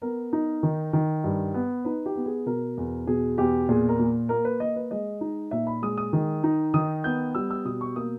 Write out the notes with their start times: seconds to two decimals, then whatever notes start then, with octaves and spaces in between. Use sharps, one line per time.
0.02 B3 A#4
0.33 D#4
0.63 D#3
0.93 D#3
1.24 G2
1.54 B3
1.85 D#4 B4
2.06 G4
2.16 B3
2.26 G#4
2.46 B2 A#4
2.77 E2
3.07 B2 G#4
3.38 E2 G4
3.69 A#2 G#4
3.89 A#4
4.00 A#2
4.29 A#3 A#4
4.45 B4
4.60 A#3 D#5
4.76 B4
4.91 G#3 D#5
5.21 D#4
5.51 A#2 E5
5.67 B5
5.82 G#3 D#6
5.98 D#6
6.13 D#3
6.44 D#4
6.74 D#3 D#6
7.04 B3 G6
7.35 G3 E6
7.51 E6
7.65 B2 D#6
7.81 C#6
7.96 A#3 D#6